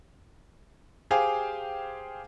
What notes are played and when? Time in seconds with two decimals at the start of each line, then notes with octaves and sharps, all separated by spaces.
1.11 G4 G#4 C5 F5 G5 G#5